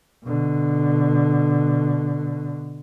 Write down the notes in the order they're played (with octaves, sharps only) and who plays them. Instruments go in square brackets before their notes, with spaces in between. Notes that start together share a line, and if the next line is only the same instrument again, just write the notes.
[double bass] B2 D3